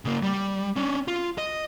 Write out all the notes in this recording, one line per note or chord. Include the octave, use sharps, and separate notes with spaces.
C#3 A#3
G3
C#4 D4
F4
D#5